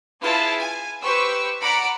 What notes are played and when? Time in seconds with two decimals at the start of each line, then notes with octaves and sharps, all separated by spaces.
0.22 E4 F4 G#4 B4 A5
0.59 G#5
1.02 G4 B4 C5 C#6 E6
1.61 D5 F#5 A#5 B5 C#7 D7